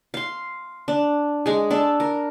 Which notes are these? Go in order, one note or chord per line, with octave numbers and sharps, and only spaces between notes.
F5 C6
D4
G#3 G#4
D4 A4
A#4